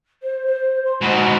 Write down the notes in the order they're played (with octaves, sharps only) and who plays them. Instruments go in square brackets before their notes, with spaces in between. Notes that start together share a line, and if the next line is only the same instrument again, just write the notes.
[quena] C5
C5
C6
[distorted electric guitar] G#2 B2 [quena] B5